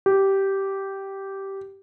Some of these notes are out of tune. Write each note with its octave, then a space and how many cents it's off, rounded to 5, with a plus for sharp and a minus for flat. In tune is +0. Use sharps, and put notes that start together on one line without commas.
G4 -10